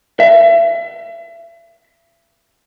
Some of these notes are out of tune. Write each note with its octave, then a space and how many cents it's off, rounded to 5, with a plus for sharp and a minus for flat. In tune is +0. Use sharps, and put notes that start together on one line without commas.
E5 +35